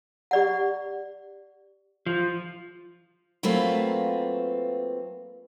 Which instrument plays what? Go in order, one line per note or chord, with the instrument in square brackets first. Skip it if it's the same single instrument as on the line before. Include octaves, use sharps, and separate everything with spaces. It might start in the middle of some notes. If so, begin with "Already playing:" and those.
[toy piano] G4 D5 F#5
[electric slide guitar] F3
[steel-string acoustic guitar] F#3 A3 A#3 C4 F4 B4